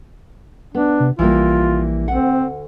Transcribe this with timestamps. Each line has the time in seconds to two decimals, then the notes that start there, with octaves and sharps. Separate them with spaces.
0.75 B3 D4
1.00 C3
1.19 A#1 E3 G3 A#3 F4
2.08 D2 C4 F#5